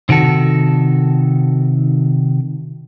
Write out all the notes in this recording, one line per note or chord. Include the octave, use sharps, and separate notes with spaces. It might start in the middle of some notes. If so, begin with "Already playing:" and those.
C3 D#3 F#4 A4